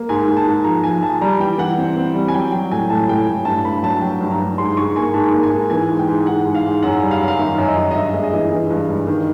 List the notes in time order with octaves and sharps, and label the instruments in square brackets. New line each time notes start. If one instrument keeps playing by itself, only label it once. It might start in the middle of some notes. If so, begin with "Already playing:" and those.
Already playing: [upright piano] A#3
G#2 G#5
G#2
A5
G#2
F3 A#5
F3 G#5
F3 A5
G3 A#5
E3 G5
E3 F#5
C4
C4
G3
G#5
F#3 G5
F#3 G5
A2 G#5
A2 A5
A2 G5
G#5
A2
G2 A5
G2 B5
F#3 A5
F#3 G5
G2
A#5
G2
G#2 C6
G#2 C#6
A#3 G#5
G#2 A5
A#3
G#5
G#2
E3 G#5
G#2
G5
G#2
G#2 F#5
G#2
F5
G#2
F#2 F#5
G3
F5
F#2
F5
D#3 E5
F#2
D#5
F#2
D#5
G2 E5
G#3
D#5
E3
E3
G2
G2
D#3